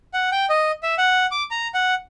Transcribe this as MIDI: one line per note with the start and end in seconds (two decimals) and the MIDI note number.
0.14 0.30 78
0.32 0.45 79
0.50 0.71 75
0.83 0.95 76
0.98 1.26 78
1.31 1.43 86
1.51 1.68 82
1.74 1.94 78